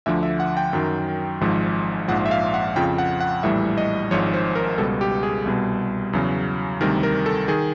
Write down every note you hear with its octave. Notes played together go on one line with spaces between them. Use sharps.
D2 D3 F3 E5
E5
F#5
G5
F#2 D#3 F#3
G#1 G#2 F3
A#1 G#2 F3 F#5
E5
F5
F#5
F2 C#3 F3 G5
F#5
F#5
A#1 A2 E3 G3 E5
D#5
G#1 G#2 F3 C#5
C5
A#4
C#2 B2 G3 A4
G4
G#4
C2 B2 G3
E2 C#3 F#3
D2 C3 D#3 G3 A#4
A#4
A4
D#3 G#4